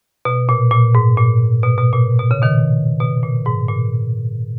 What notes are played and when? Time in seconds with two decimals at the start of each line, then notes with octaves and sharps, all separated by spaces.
0.25 B2
0.49 A#2
0.71 A#2
0.95 G#2
1.17 A#2
1.63 B2
1.78 B2
1.93 A#2
2.19 B2
2.31 C#3
2.42 B2 D#3
3.00 B2
3.23 A#2
3.45 G#2
3.68 A#2